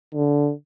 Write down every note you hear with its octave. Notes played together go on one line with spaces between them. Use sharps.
D3